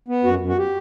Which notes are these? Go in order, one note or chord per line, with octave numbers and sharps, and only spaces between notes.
B3
F#2 F#4
F#2
F#4
G4